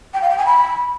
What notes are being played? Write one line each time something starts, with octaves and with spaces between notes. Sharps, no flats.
G5
F5
G5
G#5
B5